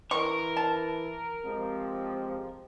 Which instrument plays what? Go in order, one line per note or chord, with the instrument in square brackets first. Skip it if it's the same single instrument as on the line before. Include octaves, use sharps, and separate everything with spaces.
[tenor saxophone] E3 [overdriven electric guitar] A#4 [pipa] C#6
[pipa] A5
[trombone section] F3 C4 G4 [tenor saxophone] G#3